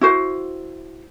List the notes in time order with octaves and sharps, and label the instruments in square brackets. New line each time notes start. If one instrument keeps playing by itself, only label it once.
[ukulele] E4 F#4 C5